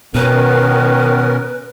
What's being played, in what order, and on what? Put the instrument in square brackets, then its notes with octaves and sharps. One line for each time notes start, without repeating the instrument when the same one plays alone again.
[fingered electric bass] B2 [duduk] D#3 [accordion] B3 C#4 A#4 [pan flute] B4